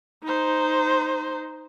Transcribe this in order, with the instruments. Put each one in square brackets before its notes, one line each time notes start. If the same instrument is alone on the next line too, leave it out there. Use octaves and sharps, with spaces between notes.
[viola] D#4 C5